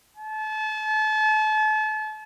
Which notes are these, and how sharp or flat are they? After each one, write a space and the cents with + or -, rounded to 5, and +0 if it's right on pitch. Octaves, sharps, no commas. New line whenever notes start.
A5 -35